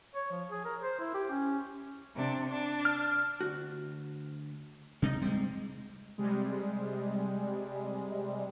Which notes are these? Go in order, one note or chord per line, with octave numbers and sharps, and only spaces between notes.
C#5
F3
G#4
A#4
C5
E4
G4
C#4
C3 D4
D4
F6
D2 F#4
C3 G#3 D#4 D#5
G#2 C3 G3 G#3
C3 G3 G#3